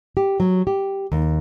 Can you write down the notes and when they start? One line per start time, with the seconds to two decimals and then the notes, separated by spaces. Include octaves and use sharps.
0.17 G4
0.40 F#3
0.67 G4
1.12 D#2